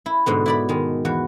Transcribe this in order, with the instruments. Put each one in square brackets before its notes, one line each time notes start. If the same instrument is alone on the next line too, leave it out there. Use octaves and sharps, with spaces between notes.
[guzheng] E4
G#2 B2 D3
E4 D5 B5
D#3 G#3
E2 F#4